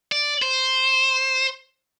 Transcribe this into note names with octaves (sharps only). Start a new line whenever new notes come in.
D5
C5